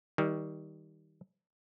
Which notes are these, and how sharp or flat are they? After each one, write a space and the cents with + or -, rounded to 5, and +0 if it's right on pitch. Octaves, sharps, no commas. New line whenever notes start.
D#3 +25 G3 +0